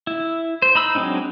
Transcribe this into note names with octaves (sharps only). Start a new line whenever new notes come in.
E4
C5
D#4 B5 E6
F#3 G#3 C4 D4 D#4